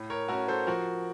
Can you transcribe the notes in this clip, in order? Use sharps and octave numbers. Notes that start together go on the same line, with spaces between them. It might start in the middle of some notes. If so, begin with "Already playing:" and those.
Already playing: A2
A#4 C#5
A3 C#4 F#4 A#4
A4 C5
F3 F#4 A#4